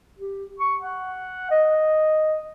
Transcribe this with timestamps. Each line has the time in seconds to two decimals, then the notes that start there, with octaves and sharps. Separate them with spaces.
0.19 G4
0.59 C#6
0.80 F#5
1.51 D#5